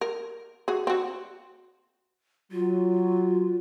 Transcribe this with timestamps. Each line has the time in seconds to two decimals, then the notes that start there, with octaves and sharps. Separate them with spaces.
0.01 A#4
0.68 F#4 G#4
0.87 C4 F#4
2.52 F#3 F4